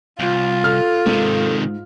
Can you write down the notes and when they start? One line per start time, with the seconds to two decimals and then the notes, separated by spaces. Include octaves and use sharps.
0.19 C2 F4
0.64 A4 F6
1.06 G#2 C3 D#3